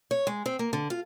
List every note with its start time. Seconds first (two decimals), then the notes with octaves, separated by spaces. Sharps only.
0.11 C#5
0.27 G#3
0.46 C4
0.59 A#3
0.73 D3
0.90 F4